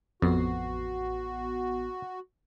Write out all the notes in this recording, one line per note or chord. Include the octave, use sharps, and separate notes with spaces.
A1 F2 B3 F#4 C7